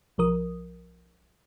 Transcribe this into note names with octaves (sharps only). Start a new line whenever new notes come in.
B1 F3 A#4 D#6